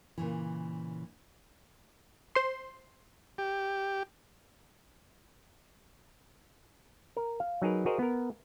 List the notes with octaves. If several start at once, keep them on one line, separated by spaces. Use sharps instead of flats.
A#2 C#3 E3
C5 C6
G4
A#4
F5
F#3 D#4 G#4 A#4 B4
F#4 G#4 A#4 C5 D#5
B3 A#4